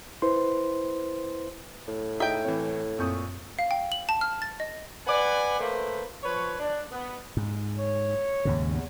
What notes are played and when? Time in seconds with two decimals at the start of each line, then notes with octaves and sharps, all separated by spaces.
0.22 E4 B4 C5 C6
1.88 A2
2.20 D#4 G#4 D#5 E5 G5
2.45 E3 C4 C#5
2.99 F#2 A#2 C4 C#6 D#6 G6
3.59 F5
3.71 G5
3.92 F#7
4.09 A5
4.21 F6
4.42 A6
4.60 D#5
5.07 B4 D5 F#5 G#5
5.60 A3 A#3 B4 C5
6.24 F3 B4 C#5
6.60 D4
6.92 B3
7.37 G#2
7.78 C#5
8.45 D#2 G#2 C#3
8.69 E2